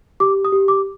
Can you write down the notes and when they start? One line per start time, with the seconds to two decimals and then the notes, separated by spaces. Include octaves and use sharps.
0.20 G4 D6
0.45 D#6
0.52 G4
0.68 D6